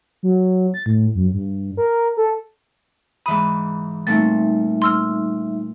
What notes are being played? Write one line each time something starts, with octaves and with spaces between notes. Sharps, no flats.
F#3
A6
A2
F#2
G2
A#4
A4
G#2 E3 B5 D#6
A#2 G3 A3 C4 D#4 E5 A6
C6 E6 F6